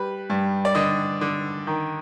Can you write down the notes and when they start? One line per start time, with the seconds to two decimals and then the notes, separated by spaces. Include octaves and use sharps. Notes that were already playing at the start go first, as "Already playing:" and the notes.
Already playing: G3 B4
0.30 G2
0.65 D5
0.75 D3 D#5
1.21 D3
1.67 D#3